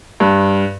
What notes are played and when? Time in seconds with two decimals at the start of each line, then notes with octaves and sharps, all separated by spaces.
0.20 G2